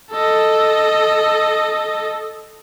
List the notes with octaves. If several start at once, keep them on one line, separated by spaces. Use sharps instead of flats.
A4 D#5